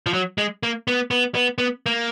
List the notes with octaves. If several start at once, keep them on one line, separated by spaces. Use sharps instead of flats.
F3
F#3
G#3
A#3
B3
B3
B3
B3
A#3